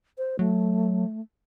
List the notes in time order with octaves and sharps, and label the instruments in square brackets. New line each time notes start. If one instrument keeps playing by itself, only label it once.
[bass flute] C5
[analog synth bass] F#3 [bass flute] A3